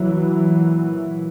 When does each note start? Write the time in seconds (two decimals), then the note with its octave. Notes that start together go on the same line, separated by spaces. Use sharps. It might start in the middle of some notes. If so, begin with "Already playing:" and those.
Already playing: E3 F#3
0.37 A#2